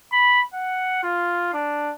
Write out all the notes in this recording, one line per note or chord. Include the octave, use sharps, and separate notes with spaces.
B5
F#5
F4
D4